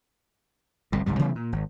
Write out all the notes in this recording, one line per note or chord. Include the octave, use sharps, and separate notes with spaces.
G1 C2 A2
G1 C#2 G#2 G3
C3 E3 G3 B3
A#2
G#1